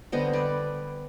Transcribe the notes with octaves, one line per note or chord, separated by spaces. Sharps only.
D3 G3 B3 C5 D#5
B4 D5